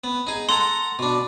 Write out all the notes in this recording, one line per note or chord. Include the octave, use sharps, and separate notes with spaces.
B3
D#4 G#4
A4 F#5 A#5 C6
B2 D4